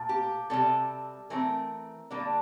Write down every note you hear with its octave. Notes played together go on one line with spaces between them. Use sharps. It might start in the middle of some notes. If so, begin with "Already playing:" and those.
Already playing: A#2 A3
G4
C3 G3 C4 A4
E3 A3 C4 A#4
D3 G3 A#3 D4